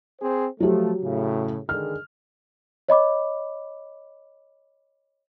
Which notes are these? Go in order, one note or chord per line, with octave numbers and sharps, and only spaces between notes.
C4 G#4 C5
F3 F#3 A3 G4
A2 C#3
D3 D#3 G#3 F6
C#5 D#5 B5 D6